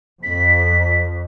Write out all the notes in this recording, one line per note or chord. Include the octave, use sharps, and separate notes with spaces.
F2 B6